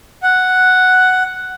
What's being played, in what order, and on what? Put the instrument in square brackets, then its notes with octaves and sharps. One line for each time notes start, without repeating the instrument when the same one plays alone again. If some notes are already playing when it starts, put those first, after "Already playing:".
[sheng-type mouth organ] F#5